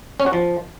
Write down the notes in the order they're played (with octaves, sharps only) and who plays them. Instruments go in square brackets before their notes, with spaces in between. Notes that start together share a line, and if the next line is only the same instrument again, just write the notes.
[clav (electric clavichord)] C#4
F#4
F3